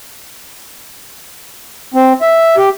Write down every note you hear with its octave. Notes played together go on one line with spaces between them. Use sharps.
C4
E5
G4